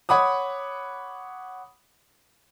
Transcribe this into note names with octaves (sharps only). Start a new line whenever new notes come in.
C#5 F#5 B5 D6 D#6